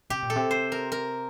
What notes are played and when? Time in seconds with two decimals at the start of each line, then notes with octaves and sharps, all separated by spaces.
0.10 C3 G4
0.22 A#2
0.30 A4
0.36 C3
0.51 C5
0.72 A#4
0.92 A#4